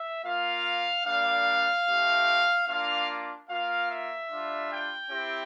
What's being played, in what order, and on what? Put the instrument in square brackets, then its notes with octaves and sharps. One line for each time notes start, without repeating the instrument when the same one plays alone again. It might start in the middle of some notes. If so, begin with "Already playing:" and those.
Already playing: [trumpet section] E5
A#3 F4 F5
G3 A#3 D4 F5
A3 C4 E4 G4
A#3 D4 F4 F5
A#3 F4 F5
E5
G3 D4 F4
G5
C4 E4 G4